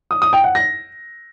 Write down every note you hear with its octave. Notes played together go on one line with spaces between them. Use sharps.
D#6
D#6
G5
F#5
A#6